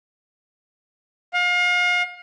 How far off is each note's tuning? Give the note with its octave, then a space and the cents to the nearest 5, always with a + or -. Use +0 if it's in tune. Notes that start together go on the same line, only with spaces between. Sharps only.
F5 +35